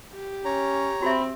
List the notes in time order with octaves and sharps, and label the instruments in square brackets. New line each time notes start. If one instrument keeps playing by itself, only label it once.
[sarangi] G4
[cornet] C#4 [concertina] C#5 A#5
[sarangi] C4 [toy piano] F#4 G4 E5 [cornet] B5